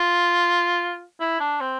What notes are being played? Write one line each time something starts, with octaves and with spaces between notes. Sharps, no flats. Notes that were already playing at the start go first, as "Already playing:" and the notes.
Already playing: F4
E4
D4
C4